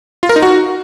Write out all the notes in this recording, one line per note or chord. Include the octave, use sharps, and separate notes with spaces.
F4
A#4
D#4
F#4